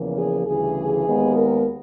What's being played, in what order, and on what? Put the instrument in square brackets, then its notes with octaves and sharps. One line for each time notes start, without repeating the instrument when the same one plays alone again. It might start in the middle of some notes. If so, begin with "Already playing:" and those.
Already playing: [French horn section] E2 C#3 F3 A#3
G#4
D2 C#3 E3 G3 G#4
D#2 D#3 G#3 B3
A#4